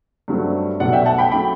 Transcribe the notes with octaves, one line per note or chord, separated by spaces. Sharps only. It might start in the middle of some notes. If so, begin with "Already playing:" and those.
G2 F#3 A3 C4
B1 B2 F#3 A3 D5 F#5
E5 G5
F#5 A5
G5 B5
F#3 A3 G5 B5